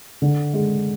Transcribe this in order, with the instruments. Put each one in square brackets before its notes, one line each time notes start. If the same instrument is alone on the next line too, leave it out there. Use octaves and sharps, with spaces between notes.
[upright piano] D3
G#3